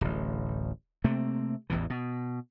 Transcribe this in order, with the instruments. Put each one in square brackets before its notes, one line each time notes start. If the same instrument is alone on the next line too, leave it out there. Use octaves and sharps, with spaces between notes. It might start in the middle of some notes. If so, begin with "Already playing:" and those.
[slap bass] D1 A1
C3 A3 A#3 C4
A1 E2 A2 E3
B2